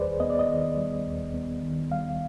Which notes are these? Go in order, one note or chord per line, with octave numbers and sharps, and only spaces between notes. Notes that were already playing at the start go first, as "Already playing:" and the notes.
Already playing: D#2 D#3 G3 G#4 B4 C5 D5
B3 D#5
D5
D#5
D#3
G3
D#2
B3
D#3
G3 F5